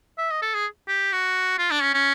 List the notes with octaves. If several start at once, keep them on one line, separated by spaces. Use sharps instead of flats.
E5
D#5
A4
G#4
G4
F#4
F4
D4
C#4
C#4